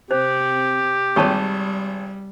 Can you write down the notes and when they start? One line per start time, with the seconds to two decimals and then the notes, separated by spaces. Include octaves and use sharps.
0.11 C3 C4 G4 C5
1.16 G#1 G3 C#5 A5 C#6